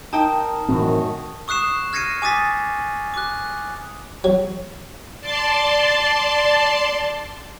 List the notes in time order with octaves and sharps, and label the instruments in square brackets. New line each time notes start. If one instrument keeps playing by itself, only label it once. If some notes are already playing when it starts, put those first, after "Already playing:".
[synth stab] D#4 G5 [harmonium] A#4 [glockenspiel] A5 D#6
[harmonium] F#2 D#3 F#4 [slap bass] A2 E3 C4
[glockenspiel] C#6 D#6 F#6 C7 E7
F6 G#6 A#6 C7 C#7 D#7
G#5 D6 D#6 A6 B6
D6 F#6
[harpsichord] F#3
[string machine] D5 A5 C6